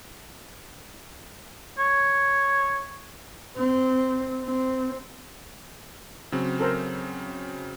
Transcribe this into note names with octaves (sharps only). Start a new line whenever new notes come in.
C#5
C4
C4
C#3 F#3 C4
A4 A#4 C5